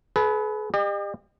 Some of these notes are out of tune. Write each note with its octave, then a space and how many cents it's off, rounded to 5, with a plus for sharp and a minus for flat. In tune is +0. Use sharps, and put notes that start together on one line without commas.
G#4 +45 B4 +0
G4 +35 D#5 -40